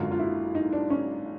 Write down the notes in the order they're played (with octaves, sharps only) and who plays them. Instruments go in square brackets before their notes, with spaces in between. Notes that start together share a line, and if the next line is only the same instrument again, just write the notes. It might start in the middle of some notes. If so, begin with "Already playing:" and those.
Already playing: [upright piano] G#1 F#2 D3 F#3 F4
F4
E4
D#4
D4
C#4